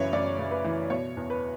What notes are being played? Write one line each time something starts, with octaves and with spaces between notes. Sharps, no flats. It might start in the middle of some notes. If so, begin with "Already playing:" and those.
Already playing: F#2 C#3 E3 B4 C#5
F#2 D5
C#3
B4
E3
B2 C#5
E2
B4